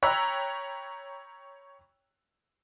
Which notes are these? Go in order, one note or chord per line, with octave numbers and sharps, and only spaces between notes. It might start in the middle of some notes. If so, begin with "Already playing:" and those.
C#5 G5 A#5 B5 E6 F#6